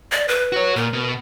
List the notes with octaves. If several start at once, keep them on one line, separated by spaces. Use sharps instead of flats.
D5
B4
F#4 C#5
A#2 A#4
B2